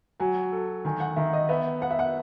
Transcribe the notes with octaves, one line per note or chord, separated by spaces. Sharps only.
F#3 G#5
A4
D#3 G#5
F#5
D#3 E5
D#5
B3 E5
B3 F#5
E5
F#5